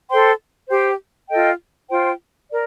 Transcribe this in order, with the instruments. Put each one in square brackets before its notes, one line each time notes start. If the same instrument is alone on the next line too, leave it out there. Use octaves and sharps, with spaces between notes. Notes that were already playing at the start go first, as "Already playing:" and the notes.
[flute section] A4 C5 G5 C6
G4 C5 G5
F4 A4 D#5 G5
F4 C5 G5
A#4 D5